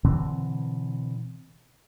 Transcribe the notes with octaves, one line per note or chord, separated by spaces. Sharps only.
B2 D3 E3 C4